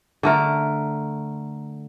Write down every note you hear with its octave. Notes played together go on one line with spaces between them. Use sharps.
D3 A3 A#4